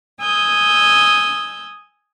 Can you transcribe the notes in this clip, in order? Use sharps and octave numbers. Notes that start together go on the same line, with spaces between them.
G#5 D#6 E6 G6